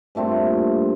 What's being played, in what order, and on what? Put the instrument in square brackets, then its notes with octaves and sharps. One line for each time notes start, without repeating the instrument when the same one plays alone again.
[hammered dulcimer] G2 A#2 A3 C4